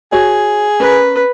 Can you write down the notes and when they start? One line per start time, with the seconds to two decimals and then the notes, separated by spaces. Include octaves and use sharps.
0.12 F#4 G#4 C#5
0.80 C#4 A#4 B4